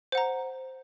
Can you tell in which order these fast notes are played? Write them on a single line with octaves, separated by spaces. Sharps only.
C5 F#5 A#5